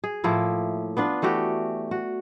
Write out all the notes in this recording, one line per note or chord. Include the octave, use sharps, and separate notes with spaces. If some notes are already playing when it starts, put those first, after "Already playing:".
G#4
A2 F3 A#3 E4
B3 D4 F4 B4
E3 A3 F#4 G4
F#4